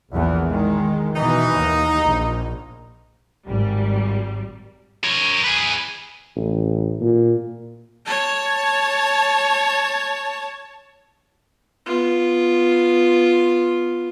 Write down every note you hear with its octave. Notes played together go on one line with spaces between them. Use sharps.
A#1 E2 A#2
D#3 G#3
B2 E3 D#4
D#2
A#1
G#1 G3
A#4 C#5
G#4 B4
A1
A#2
C#5 A5
B3 F4